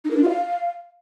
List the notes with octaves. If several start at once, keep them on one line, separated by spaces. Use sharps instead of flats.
D#4
A#4
D4
F4
F5